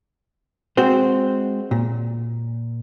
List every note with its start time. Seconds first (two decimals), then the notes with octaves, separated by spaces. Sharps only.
0.77 G#3 C4 F#4 C5
1.71 A#2